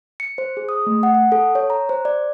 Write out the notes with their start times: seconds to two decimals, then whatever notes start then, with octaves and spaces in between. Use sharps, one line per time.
0.20 C#7
0.38 C5
0.57 G#4
0.69 D#6
0.87 A3
1.03 F#5
1.15 F#5
1.32 A4
1.55 C#5
1.70 A#5
1.89 C5
2.05 D5